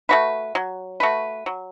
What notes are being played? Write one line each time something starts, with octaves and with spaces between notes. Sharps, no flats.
A3 F#4 B4
F#3
A3 F#4 B4
F#3